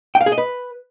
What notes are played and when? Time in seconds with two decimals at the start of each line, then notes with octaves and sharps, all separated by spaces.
0.15 G5
0.21 F5
0.26 G#4
0.32 D#5
0.38 B4